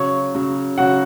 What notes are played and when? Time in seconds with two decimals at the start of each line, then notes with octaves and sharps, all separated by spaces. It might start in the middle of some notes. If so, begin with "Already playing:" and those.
Already playing: C#3 F#3 C#5 C#6
0.35 C#3 F#3
0.78 C#3 F#3 F#4 F#5